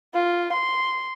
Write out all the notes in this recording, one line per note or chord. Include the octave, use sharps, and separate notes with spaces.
F4
C6